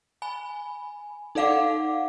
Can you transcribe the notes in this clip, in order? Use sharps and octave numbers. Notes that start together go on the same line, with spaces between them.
G#5 B5
D#4 A4 D5 F5 F#5 D6